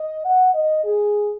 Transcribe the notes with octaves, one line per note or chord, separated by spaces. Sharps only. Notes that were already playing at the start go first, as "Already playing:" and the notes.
Already playing: D#5
F#5
D#5
G#4